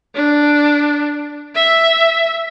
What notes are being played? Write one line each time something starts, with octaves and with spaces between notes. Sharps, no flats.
D4
E5